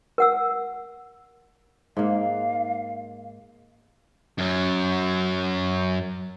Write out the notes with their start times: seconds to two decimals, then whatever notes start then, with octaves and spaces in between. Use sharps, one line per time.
0.18 A#4 F#5 E6
1.97 G#2 A#3 F5
4.39 F#2 F#3